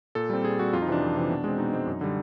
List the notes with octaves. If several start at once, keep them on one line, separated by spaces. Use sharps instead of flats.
A#2 A4
G3 C4
A#2 G#4
G3 C4 F#4
F2 F4
D#4
C3 E3 D4
F2
C3 E3
B2
G#3 C4
B2 D#4
G#3 C4
F#2
D3 G3